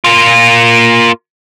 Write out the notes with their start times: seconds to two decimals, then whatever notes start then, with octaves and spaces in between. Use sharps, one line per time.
0.04 A#3 F4